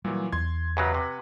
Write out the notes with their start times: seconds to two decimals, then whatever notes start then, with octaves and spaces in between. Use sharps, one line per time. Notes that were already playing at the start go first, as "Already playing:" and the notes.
0.04 A#2 E3 F#3 G3
0.33 E2 C6 G#6
0.77 F#2 C#3 F#3 G4 B4 F#5
0.94 C3